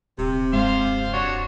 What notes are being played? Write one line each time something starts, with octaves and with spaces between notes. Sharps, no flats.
D#1 C3
F#2 G#3 C5 F5 C6
D4 F#4 C#5